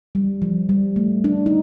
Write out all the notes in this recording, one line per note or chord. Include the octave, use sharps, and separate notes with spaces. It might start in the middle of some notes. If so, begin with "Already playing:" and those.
G3
F3
G3
A3
D4
D#4